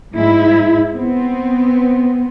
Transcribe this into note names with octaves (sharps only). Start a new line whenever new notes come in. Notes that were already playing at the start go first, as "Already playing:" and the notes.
G#2 G#3 E4
B3 C4